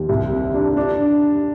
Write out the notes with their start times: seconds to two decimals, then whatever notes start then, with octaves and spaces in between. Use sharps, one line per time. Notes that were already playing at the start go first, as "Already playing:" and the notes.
Already playing: D#2
0.09 C2
0.32 C3
0.54 D4
0.77 D4